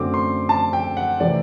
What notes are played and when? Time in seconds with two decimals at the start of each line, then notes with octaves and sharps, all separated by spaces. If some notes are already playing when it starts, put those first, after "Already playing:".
Already playing: F#2 D3 A3 C4 D6
0.14 C6
0.49 A5
0.73 G5
0.97 F#5
1.20 C3 E3 A3 C4 D5